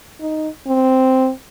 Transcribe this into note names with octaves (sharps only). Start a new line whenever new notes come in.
D#4
C4